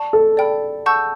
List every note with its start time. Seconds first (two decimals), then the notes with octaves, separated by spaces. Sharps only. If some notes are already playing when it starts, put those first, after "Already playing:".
Already playing: D5 A5 C#6
0.13 A4
0.37 D5 G5 B5
0.86 F#5 A5 C#6 E6 G6